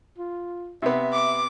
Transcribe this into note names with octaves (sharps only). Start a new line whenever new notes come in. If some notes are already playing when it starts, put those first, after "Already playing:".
F4
C3 B3 E5
D6